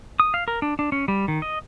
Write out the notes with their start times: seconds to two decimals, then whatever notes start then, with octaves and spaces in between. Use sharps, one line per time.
0.20 D#6
0.34 F5
0.48 A#4
0.62 D4
0.79 D4
0.92 C#4
1.08 G3
1.28 D#3
1.42 D#5